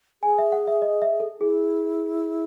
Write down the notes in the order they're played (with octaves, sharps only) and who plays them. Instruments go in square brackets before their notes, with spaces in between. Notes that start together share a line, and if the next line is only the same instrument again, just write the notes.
[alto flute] G#4 [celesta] G#5
[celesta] E5
F#5
E5
D#5
E5
A4
[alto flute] E4 [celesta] G#4